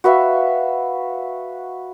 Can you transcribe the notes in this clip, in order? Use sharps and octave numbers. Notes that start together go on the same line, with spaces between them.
F#4 B4 E5 F5